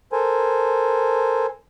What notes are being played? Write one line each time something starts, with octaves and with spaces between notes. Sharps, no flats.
A4 A#4 C5 G#5